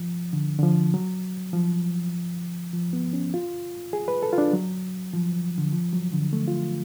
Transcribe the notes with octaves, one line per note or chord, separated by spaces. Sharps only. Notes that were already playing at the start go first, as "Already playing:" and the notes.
Already playing: F3
D3
D3
F3
F#3
F3
F3
B3
C#4
F4
G#4
B4
A4
F4
D4
F#3
F3
D3
F3
F#3
D3
A3
F4